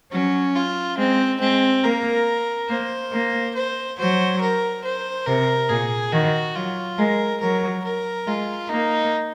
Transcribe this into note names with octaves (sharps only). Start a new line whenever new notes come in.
F#3 C#4
F4
G#3 C4
G#3 C4
A#3 A#4
A#3 C5
A#3
C5
F#3 C5
A#4
C5
C3 A#4
A#2 G#4
D#3 F#4
F#3 F4
G#3 A#4
F#3 A#4
A#4
G#3 F4
A#3 D#4